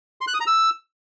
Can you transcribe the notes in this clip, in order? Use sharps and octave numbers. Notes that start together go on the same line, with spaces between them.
C6
F#6
D#6
A#5
E6